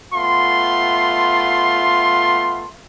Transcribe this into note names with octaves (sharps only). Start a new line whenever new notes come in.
A3 B3 F4 C6